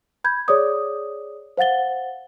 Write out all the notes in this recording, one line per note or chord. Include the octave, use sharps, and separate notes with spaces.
B5 G6 G#6
G#4 C#5 D5 D6 D#6
C5 F5 F#5 A6 G7